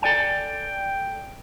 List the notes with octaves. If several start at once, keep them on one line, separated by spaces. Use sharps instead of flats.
A4 D5 G5 G#5